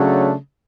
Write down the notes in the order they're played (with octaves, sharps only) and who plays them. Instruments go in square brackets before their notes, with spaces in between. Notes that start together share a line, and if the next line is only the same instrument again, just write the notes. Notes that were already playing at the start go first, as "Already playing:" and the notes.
Already playing: [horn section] C#3 F#3 A3 D4